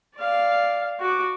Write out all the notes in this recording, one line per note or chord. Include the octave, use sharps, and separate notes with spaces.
D5 F5
F#4 D6